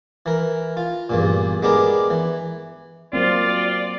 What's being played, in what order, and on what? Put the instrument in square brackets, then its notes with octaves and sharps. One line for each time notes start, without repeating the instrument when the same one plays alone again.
[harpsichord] E3 A#4
F4
E2 G2 A#2
G#3 B3 D4 G4 A#4
E3
[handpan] F#3 A#3 C4 [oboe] F4 [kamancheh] D5